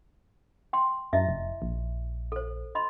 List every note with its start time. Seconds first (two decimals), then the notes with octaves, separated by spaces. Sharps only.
0.73 G5 C6
1.13 F#2 E4 D#5 E5
1.29 F1
1.62 A#1
2.32 A4 C5
2.75 D#5 B5 C6